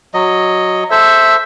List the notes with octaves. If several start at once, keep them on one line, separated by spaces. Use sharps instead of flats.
F#3 D#5
A4 C5 E5